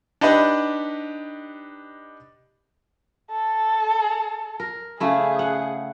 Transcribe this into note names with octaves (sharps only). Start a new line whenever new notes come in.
D4 D#4 G4 B4 D#5
A4
A#4
C#3 A3 E4 G#4
F#5